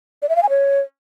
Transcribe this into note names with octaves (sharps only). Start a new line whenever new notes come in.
D5
E5
F5
G#5
C#5